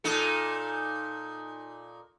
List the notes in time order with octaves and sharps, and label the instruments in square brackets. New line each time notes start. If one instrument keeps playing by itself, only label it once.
[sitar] A#2 D#4 A4